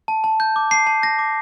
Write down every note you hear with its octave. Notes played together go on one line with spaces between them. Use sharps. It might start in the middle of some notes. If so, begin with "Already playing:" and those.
A5
A5
G6
D6
A5 C7
A5
G6 A#6
D6